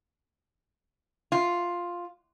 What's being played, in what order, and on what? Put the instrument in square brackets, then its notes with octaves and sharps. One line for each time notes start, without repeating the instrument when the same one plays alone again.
[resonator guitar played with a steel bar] F4